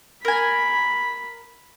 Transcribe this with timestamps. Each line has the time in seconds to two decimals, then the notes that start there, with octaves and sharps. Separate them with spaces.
0.25 A#4 G#5 B5